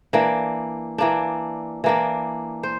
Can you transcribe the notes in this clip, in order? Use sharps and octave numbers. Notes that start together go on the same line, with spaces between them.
E3 A#3 D4
E3 A#3 D4
E3 A#3 D4
C5